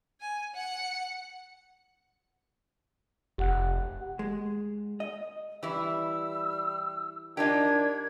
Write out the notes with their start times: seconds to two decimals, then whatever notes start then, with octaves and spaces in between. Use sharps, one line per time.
0.21 G#5
0.55 F#5 C#7
3.38 F1 G4 F#5 F#6
4.19 G#3
5.00 D#5
5.63 E3 G3 E4 E6
7.37 D#3 D4 D#4 F4 G4 G#6